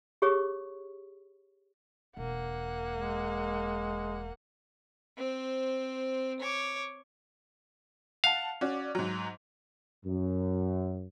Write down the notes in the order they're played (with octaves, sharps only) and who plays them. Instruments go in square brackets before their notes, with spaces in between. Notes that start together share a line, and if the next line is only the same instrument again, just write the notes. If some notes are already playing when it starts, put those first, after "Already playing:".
[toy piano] G4 G#4 C#5 C#6 D#6
[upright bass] E1 [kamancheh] A#3 F#5
[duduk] G#3
[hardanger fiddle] C4 C5
C#5 D6
[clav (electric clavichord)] F5 [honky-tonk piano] F#5 A5
[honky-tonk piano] C#4 F#4 D5
G#2 F#3
[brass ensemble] F#2